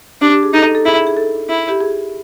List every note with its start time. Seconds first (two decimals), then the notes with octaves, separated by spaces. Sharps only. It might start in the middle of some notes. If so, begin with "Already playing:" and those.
0.21 D4 G4
0.32 G4
0.43 G#4
0.53 D#4 A4
0.63 A4
0.75 A4
0.85 E4 G#4
0.96 G#4
1.07 G#4
1.17 A4
1.49 E4
1.69 G4
1.81 G#4